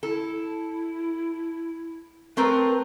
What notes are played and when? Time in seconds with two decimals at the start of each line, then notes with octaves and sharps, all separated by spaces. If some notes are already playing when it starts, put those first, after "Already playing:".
0.03 E4 A4
2.37 A3 C4 A#4 B4